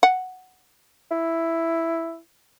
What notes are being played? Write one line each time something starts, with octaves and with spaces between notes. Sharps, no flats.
F#5
E4